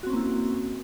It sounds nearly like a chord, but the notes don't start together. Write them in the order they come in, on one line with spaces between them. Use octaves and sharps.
F#4 C4 C#4 A#3 E4